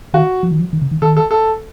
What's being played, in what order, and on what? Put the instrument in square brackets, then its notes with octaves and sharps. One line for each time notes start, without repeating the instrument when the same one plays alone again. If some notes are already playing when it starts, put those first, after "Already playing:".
[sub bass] D#3 [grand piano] F#4
[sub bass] F3
D#3
F3
D#3
C#3
D#3
[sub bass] D#3 [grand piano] A4
[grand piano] A4
A4